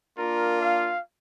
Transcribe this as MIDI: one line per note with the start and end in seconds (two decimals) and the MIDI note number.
0.18 0.95 58
0.18 0.95 62
0.18 0.95 65
0.18 0.60 70
0.61 1.00 77